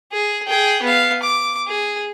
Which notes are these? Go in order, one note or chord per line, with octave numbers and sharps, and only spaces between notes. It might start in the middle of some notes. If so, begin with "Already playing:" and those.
G#4
G#4 G5
B3 F5
D6
G#4